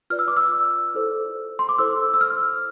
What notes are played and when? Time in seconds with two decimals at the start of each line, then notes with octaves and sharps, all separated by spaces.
0.10 F4 B4 D5 F6
0.19 E6
0.28 D6
0.37 E6
0.94 E4 A4 C5
1.59 C6
1.69 D6
1.79 E4 A4 C5 E6
2.14 E6
2.21 F6